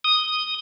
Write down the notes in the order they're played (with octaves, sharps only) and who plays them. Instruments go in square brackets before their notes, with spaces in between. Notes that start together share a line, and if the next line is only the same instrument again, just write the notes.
[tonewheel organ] D#6